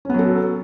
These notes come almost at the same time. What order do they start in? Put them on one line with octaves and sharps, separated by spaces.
C#4 B3 F#3 A4